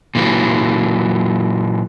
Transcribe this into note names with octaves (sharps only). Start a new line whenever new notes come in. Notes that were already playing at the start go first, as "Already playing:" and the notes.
A#2 E3 F#3